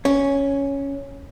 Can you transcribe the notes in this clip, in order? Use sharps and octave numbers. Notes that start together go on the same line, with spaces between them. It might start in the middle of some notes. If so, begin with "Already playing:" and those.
C#4